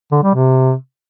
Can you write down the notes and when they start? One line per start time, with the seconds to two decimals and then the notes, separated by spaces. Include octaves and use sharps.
0.11 D3
0.23 G3
0.34 C3